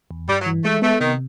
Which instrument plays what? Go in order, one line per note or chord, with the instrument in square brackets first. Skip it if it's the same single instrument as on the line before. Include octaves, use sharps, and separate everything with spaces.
[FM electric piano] E2
[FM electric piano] G2 [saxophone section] G3
[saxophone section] F#3
[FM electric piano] E3
[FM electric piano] G#3 [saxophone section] A3
[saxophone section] A3 [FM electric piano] B3
[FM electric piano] C3 [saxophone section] D#3